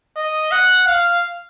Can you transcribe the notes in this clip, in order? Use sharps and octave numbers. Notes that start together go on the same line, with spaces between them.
D#5
F#5
F5